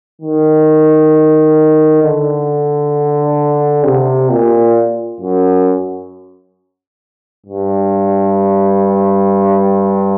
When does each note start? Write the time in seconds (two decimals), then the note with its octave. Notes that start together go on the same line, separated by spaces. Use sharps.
0.22 D#3
2.03 D3
3.84 C3
4.30 A#2
5.20 F#2
7.46 G2